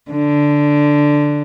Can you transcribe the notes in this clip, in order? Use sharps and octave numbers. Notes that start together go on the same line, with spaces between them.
D3